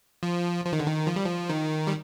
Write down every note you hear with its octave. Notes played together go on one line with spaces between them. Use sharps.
F3
F3
D#3
D3
D#3
F3
G3
F3
D#3
G3